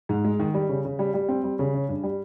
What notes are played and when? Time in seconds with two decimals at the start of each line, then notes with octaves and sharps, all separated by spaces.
0.09 G#2
0.25 G#3
0.40 D#3
0.54 G3
0.69 C#3
0.85 C#3
0.99 G3
1.14 G3
1.29 C4
1.44 G3
1.59 C#3
1.74 C#4
1.89 G2
2.03 G3